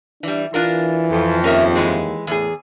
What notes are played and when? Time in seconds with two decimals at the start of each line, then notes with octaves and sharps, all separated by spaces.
0.23 E3 G3 D4
0.54 E3 D4 F4 A#4
1.11 F2
1.44 D#2 C#4 A#4 E5
1.76 E3 G#3
2.27 E2 A2 G#4